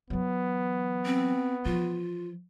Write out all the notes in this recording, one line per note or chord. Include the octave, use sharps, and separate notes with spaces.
E3 F#3 B3
C4
E3 F3 F4